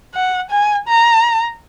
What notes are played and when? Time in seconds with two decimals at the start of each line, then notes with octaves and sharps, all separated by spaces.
0.15 F#5
0.51 G#5
0.88 A#5